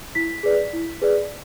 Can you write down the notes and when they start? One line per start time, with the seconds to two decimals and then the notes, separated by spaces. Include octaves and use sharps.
0.15 E4 B6
0.43 G#4 B4 D5
0.73 E4
1.02 G#4 B4 D5